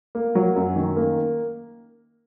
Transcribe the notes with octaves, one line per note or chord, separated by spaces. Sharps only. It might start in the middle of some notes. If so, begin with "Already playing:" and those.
A#3
F#3
F#2
D#3
A#3